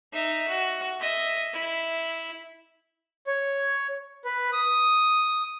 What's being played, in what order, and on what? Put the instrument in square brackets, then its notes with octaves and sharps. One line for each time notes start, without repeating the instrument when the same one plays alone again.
[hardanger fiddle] D#4 E5
F#4
D#5 E5
E4
[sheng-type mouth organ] C#5
B4
D#6